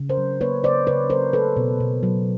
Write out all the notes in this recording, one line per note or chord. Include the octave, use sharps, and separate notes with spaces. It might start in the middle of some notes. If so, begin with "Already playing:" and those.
Already playing: C#3
A#4 C5
F#3
A#3 B4 C#5
C#3 C5 D5
C#3 B4 C#5
F#3 A#4 C5
A3 A4 B4
B2
B2
F#3